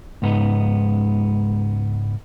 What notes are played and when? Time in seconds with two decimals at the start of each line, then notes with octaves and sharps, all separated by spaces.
0.22 C#2 G#2 B3 D#4